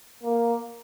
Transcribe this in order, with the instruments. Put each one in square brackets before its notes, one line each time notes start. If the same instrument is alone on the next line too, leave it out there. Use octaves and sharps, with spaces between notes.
[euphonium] A#3